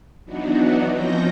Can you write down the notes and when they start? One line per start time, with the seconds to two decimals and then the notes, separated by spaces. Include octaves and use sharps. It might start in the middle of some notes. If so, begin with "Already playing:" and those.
0.25 E3 F#3 B3 D4 D#4 F#4
0.89 F3 C4 C#4 D#4 G6 A#6